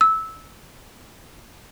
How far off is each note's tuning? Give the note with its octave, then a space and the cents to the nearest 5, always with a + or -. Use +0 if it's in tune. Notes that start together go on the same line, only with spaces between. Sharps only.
E6 -15